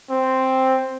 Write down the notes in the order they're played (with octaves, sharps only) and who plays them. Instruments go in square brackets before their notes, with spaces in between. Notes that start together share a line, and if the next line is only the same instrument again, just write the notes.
[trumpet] C4